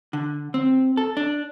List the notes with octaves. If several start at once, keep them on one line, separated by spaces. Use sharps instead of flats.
D3
C4
A4
D4